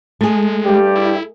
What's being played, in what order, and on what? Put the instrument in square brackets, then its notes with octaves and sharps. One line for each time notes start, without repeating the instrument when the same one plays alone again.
[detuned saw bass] G#3 [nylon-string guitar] A3 G#4
[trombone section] G2 G3 G4
[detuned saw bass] E4